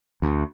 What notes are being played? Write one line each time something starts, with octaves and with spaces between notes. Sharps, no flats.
D2